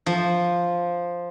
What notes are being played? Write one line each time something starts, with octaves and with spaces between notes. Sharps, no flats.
F3